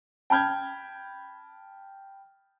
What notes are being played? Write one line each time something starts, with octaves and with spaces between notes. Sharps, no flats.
G5 A5 B5 F6 G6 G#6